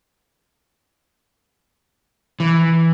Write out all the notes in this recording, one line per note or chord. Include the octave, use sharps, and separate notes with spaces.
E3